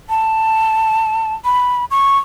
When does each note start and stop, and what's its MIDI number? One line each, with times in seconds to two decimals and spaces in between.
0.09 1.34 81
1.45 1.85 83
1.91 2.18 85